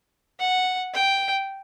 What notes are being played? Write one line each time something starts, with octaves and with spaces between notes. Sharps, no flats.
F#5
G5